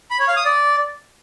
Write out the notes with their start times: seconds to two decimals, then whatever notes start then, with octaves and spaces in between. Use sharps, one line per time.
0.11 B5
0.19 C#5
0.28 F5
0.36 D#6
0.45 D5